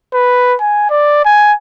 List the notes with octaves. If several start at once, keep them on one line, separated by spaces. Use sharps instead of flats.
B4
G#5
D5
G#5